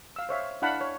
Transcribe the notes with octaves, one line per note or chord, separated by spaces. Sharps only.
F5 E6
C5 C#5 E5 F5
D4 E4 F5 F#5 A5 B5
C#5